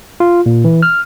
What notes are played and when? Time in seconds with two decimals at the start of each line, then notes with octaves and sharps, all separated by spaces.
0.20 F4
0.46 A#2
0.65 E3
0.82 F6